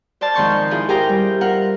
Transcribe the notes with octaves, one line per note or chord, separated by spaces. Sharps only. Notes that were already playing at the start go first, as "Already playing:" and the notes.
C5 D5 A5 F6
F2 G#2 D#3 C6 C#6 G6
E4 F4 G#4
G4 G#4 A#4 C5 G5 A#5
G3
F4 A#4 F#5